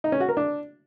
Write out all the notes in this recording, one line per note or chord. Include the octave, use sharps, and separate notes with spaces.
D#4
C#4
F#4
A#4
D4